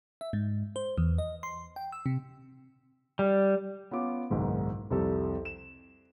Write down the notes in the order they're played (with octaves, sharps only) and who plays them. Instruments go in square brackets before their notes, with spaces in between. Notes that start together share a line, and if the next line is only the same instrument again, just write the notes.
[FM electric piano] E5
G#2
C5
E2
D#5
C6
G5
E6
C3
[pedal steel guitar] G3
[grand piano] B3 C#4 F4 D6
F#1 B1 G#2 D#3
C2 F2 G3 A4
E7